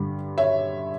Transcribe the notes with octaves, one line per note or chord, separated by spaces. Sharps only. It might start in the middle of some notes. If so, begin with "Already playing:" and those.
Already playing: G2 D3 G3
C#5 E5